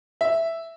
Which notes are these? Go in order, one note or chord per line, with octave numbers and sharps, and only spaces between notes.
E5